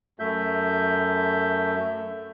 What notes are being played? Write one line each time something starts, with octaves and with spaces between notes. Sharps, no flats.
F#2 A3 E5 G6